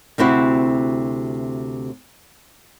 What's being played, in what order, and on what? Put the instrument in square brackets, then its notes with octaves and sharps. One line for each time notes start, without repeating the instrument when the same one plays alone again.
[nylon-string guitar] D2 C3 C4 E4 F#4